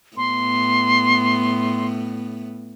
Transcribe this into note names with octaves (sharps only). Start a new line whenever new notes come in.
A2 B3 C6